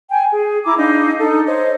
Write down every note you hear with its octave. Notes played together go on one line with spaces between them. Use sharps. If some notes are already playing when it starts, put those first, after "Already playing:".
G5 G#5
G#4
E4 A#5 D6
D4 D#4 F5
D#4 A4
C5 C#5 D#5